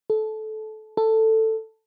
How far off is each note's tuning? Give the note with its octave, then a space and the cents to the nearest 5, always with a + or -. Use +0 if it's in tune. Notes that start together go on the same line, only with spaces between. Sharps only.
A4 -20
A4 +10